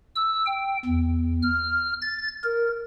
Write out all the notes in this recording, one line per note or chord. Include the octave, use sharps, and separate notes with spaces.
E6
G5
E2
F6
A6
A#4